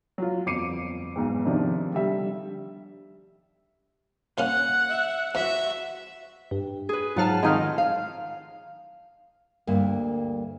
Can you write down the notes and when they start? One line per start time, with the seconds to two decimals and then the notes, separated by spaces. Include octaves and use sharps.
0.18 F#3 F4
0.46 G1 F2 D6 C7 C#7 D#7
1.16 B1 E2 G#2
1.45 C3 D#3 F3 D4 D#4
1.93 D3 G3 E5
4.38 A#2 C#3 C#4 F#5
4.89 E5
5.35 E2 F#4 E5
6.51 G2
6.89 G#4 B4
7.16 G#2 F#3 F4 F#5 A5 F6
7.43 F2 D#3 G#3 D#4 F6
7.78 F5
9.67 D2 G2 A#3